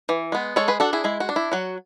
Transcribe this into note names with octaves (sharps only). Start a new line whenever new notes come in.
E3
G#3 B3
G#3 A4 C#5
G#4 B4
D4 F#4 A4
E4 G#4
G#3 E4
F#4
D4
E4
F#3 F#4